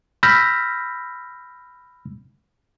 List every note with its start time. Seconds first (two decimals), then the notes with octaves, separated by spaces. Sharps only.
0.23 B5 E6 F6 G6 A#6 B6